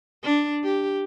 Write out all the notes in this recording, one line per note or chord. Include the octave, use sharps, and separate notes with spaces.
D4
G4